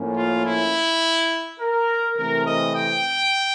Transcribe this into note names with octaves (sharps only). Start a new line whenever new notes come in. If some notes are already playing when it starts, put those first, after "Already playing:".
Already playing: A2 F3 A#3 C#4
F4
E4
A#4
C3 E3 A3 C4 A#4
D#5
G5